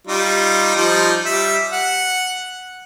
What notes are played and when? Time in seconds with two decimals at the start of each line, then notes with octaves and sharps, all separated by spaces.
0.07 G3 D#4 F4
0.75 F3 G3 D#4
1.26 G3 E5
1.72 F#5